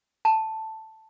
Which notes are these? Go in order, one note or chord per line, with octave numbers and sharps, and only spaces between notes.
A5